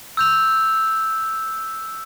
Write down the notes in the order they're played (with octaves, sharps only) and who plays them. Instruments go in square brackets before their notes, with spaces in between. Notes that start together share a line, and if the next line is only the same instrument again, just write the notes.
[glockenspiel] E6 G6 F7